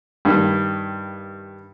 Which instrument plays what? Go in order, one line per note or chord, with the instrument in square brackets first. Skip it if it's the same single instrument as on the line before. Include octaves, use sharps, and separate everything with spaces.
[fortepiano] G2 D#3